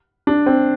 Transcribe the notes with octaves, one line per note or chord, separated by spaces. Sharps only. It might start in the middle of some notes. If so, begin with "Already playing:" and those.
D4
C4